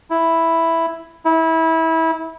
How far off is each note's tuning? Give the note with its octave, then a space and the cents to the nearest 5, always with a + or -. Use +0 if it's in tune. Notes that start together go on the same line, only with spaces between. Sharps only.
E4 +0
E4 -25